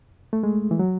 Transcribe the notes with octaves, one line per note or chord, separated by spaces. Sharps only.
A3
G#3
E3
F#3